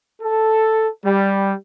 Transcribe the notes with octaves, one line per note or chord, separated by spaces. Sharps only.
A4
G3